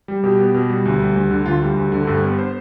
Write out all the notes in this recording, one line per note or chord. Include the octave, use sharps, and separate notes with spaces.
G3
B2 G4
B3
B2
G3
D2
G3
D2
D3
D2 F4
G3
D2
D3
G2 A4
B3
C5